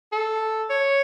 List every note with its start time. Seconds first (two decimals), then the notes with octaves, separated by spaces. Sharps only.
0.13 A4
0.70 C#5